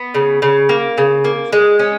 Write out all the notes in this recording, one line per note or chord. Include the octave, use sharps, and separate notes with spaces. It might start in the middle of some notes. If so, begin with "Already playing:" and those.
Already playing: B3
C#3
C#3
A#3
C#3
A#3
G#3
C#4